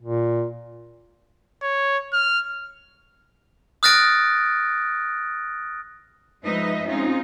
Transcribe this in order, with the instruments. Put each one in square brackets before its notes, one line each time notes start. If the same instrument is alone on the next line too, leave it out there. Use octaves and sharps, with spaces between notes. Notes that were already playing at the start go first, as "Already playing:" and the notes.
[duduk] A#2
[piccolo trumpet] C#5
F6
[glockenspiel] D#6 F6 F#6 A6 A#6 D7
[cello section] F3 G#3 D#4 B4 D#5 E5
G#3 C4 C#4 D#4 F4